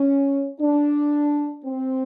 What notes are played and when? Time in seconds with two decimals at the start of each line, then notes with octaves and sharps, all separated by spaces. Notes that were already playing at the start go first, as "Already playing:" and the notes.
Already playing: C#4
0.60 D4
1.65 C4